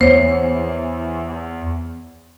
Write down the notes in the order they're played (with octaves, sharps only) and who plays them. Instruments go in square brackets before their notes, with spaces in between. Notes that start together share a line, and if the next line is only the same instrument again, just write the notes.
[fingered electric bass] E2 B3 [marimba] C5 C#5